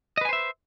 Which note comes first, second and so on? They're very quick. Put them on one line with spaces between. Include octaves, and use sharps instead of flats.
D#5 B4 G#5 C5 E5